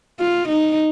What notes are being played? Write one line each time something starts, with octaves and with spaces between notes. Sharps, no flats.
F4
D#4